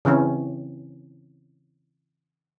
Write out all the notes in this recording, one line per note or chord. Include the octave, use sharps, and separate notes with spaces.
C#3 E3 C4 C#4